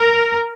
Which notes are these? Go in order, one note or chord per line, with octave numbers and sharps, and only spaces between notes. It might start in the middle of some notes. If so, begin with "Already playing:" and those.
Already playing: A#4